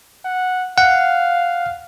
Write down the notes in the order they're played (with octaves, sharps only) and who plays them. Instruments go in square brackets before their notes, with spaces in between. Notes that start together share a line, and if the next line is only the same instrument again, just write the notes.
[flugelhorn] F#5
[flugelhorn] F5 [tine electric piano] F#5